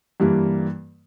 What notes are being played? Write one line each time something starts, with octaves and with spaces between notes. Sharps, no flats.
G2 E3 G3 A#3